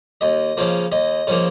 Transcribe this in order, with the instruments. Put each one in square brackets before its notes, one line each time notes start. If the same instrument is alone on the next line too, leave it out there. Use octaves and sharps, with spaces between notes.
[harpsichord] D#2 D#5
C#3 F3 A#3
D#2 D#5
C#3 F3 A#3